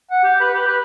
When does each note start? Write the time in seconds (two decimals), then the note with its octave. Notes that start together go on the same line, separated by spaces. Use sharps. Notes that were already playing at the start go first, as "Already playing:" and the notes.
0.11 F#5
0.24 G4
0.41 B4
0.54 G4
0.67 B4